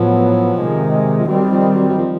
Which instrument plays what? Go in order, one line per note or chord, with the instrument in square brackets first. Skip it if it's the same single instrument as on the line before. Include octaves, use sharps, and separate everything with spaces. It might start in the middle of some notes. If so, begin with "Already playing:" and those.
Already playing: [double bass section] A2 F#3 B3 [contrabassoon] F3
[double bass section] C3 D#3 G#3
[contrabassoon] F3
[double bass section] D#3 G3 C4 [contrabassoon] F#3
[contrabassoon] F3
F#3
F#3
F3